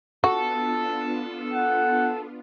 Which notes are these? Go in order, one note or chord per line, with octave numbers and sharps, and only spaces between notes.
B3 D4 F4 F#4 A4
F#5